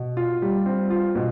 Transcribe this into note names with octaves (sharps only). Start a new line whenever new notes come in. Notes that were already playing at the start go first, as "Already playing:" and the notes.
Already playing: B2
F4
G3
C4
F4
B2